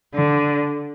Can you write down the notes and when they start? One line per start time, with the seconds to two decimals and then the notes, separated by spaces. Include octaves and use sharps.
0.14 D3